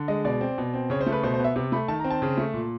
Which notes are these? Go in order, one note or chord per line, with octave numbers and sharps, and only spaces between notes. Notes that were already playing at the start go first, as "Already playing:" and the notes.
Already playing: D3
G#3 D#5
B2 D5
C4
B2
C4
C#3 C#5
C5
A3
B4
B2 C5
C5
B3 E5
C3
A3 B5
D#3 A5
A#5
C4
A5
C#3
A3
A#2